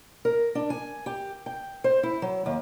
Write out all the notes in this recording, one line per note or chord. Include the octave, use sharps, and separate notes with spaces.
A#4
D4
G#5
G4
G5
C5
E4
F#3
D#2